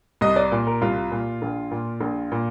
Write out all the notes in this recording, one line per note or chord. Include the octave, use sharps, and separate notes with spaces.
C2 D#5
D5
A#2
A#4
C2 F4
A#2
A#1
A#2
A#1
A#2